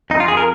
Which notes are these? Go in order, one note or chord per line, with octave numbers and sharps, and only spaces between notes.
F2 D#4
F4
F2 G#4
A#4